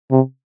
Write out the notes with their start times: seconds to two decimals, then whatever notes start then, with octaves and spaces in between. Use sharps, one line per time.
0.11 C3